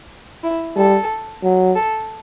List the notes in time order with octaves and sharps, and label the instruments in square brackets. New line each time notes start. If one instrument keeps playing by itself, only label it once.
[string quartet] E4
[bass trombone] G3 [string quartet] A4
[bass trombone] F#3
[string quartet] A4